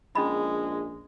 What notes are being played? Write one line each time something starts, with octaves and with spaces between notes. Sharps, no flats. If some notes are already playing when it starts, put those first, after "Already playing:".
A#1 G#3 C#4 D#4 B5